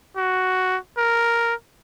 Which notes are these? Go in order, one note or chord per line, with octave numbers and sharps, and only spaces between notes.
F#4
A#4